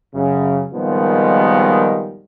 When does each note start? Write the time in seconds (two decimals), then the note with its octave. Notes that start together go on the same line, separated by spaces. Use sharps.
0.15 F#2 C#3
0.74 A#2 D#3 F3 G3 G#3 B3